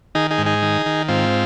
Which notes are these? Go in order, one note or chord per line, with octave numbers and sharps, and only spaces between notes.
D#3 D#4 G#4
D#4 G#4
G#2
D#4 G#4
D#3
D#3
G#2 C4 F4